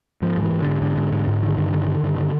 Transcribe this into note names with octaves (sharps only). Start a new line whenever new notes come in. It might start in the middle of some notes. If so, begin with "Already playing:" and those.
G#2 F3
G#2 E3
G#2
G#2 D3
G#2 D3
G#2
G#2
G#2
D3 D#3
G2
D3
D3
G2
D3